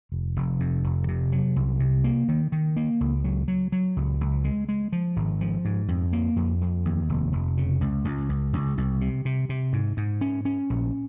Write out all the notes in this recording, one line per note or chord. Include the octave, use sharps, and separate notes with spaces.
F1
F1
F2
F1
C3
F#3
C2
C3
A#3
D#3
D#3
A#3
C#2
F#3
F#3
F#3
C#2
C#2
G#3
G#3
F3
G#1
F3
G#2
F2
A#3
F2
F2
D#2
F1
F1
C#3
C#2
C#2
C#2
C#2
C2
C3
C3
C3
G#2
G#2
C#4
C#4
A#1